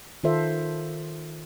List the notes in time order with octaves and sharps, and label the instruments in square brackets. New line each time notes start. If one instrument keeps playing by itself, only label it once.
[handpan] D#3 F4 A4 C5 E5